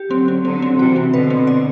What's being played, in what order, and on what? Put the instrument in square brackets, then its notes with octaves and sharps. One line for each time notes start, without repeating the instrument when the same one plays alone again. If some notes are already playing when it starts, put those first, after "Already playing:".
Already playing: [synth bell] G4
[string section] D3 F#3 [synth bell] C4
[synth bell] C4
[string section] D3 F#3 [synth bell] C4
[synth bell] C4
[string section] C3 E3 [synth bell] F#4
[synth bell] C4
[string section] B2 D3 [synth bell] B4
[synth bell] C4
D5